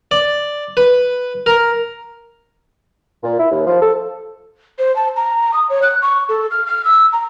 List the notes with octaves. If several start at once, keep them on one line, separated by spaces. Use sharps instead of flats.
D5
B4
A#4
A#2
E4
D#2
F3
A4
C5
A5
A#5
D#6
C#5
F#6
C#6
A4
F6
F6
E6
A#5